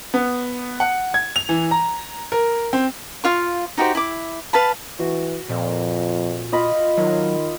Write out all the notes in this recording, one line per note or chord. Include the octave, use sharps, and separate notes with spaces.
B3
F#5
G#6
F7
E3
A#5
A#4
C4
F4 F5 C#6
D#4 F#4 G4 C5
E4 D6
B4 F5 A5 B5
E3 F#4
F2 A#2
F4 D#5 B5
D#3 F#3 F5